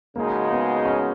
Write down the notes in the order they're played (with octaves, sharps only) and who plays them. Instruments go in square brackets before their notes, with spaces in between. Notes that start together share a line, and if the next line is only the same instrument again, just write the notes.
[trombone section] C#3 F3 G#3 D#4 F#4 [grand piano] A#3
[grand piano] B3
C#4